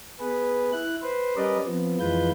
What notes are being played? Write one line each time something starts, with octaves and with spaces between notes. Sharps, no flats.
B3 G#4 B4
E4 F#6
B4 C5
G3 C#4 A#4 B4 D5 D#5
F3 B3 C4
F2 E3 G#3 F4 B4 G6